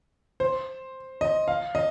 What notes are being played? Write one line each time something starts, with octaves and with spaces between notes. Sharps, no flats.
C5
D#5
F5
D#5